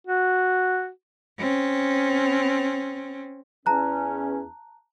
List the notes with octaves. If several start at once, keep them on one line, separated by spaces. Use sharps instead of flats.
F#4
C4 C#4
E2 C#4 A5 A#5 F#6